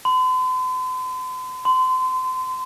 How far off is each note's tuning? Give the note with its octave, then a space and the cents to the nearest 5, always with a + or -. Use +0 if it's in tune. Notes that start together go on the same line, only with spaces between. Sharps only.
C6 -45
C6 -30